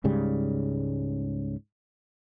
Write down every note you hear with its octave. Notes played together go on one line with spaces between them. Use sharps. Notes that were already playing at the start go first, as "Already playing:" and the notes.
C#2 G#2 C#3 G3